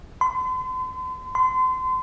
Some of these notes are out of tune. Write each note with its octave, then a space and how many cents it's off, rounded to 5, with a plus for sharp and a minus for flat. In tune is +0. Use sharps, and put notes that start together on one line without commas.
C6 -45
C6 -35